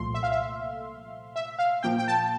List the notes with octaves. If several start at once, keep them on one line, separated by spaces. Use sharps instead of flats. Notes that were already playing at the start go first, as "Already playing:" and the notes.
Already playing: C2 A#2 F3 A3 C6
E5
F5
E5
E5
F5
A#2 F3 A#3 G5
G5
A5